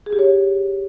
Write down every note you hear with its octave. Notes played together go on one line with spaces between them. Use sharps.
G#4
G4
C#5